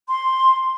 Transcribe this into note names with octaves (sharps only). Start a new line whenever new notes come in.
C6